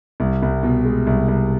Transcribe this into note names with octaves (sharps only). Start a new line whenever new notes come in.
C2
C2
B2
G#3
C2
C2